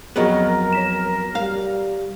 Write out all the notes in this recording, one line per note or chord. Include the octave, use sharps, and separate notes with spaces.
F2 F#3 B3 G#4 A#4 D#5 C#6
C#5 B6 E7
G3 F5